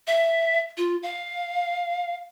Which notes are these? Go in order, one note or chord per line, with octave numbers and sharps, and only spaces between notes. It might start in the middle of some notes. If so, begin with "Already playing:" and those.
E5
F4
F5